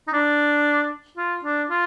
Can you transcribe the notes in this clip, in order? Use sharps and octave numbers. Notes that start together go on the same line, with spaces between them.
D#4
D4
F4
D4
F4